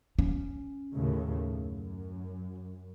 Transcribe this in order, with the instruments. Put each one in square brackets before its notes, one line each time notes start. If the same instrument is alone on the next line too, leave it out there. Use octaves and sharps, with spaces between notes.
[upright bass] C#4
[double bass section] D#2 A2 C#3
F#2